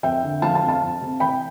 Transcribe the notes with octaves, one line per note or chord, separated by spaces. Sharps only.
F2 E5 G5
D3
F3 F5 A5
F5 A5
F2
F5 A5
F2
C3
E3 G5 B5